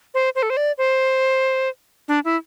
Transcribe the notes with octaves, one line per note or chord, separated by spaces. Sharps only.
C5
C5
A4
C5
D5
C5
D4
E4